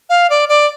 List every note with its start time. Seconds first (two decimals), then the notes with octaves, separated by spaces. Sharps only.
0.10 F5
0.30 D5
0.49 D5